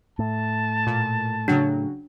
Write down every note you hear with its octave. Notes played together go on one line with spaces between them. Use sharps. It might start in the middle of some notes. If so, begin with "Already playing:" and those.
A2 A5
A#2
C#3 F#3 D4